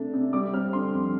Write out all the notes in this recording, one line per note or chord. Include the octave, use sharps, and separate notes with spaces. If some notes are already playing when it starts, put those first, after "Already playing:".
Already playing: C3 A3 D4
C3
G3 D6
C4 F6
D3 C6
F2